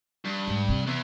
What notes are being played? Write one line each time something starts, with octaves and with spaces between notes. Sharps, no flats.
G2
G#2
C3
E2